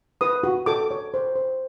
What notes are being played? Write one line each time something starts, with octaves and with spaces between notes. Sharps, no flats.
B4 D#6
F#4
A4 D6
C#5
C5
C5